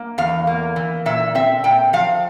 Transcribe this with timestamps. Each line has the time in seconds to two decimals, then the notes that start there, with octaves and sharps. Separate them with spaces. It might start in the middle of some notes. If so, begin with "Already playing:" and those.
Already playing: A#3
0.18 E2 F5
0.47 A#3
0.76 E3
1.06 A#2 E5
1.35 C4 E5
1.64 A#2 G5
1.93 F3 F5